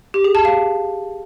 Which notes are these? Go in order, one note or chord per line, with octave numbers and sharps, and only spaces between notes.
G4
G#4
A5
F5